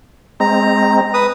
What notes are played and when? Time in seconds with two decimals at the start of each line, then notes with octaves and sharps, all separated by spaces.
0.40 G#3 C4 A#5
1.14 B4 D#6